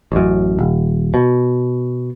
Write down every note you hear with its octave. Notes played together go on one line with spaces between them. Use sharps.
A1 F#2
D#1
B2